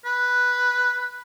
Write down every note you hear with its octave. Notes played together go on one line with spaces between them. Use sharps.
B4